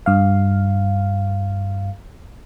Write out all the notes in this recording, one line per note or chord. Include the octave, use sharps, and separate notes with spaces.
G2 F5